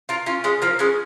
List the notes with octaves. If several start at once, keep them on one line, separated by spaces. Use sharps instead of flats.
F4 A#4
C#4 F4
G#3 C#4
F3 A#3
G#3 C#4